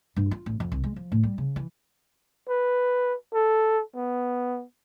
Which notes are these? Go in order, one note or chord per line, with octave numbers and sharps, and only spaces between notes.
G2
F4
A1
F2
C2
G#3
F3
A2
G3
C#3
E3
B4
A4
B3